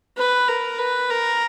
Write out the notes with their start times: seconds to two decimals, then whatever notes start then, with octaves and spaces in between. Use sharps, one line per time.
0.17 B4
0.48 A#4
0.78 B4
1.10 A#4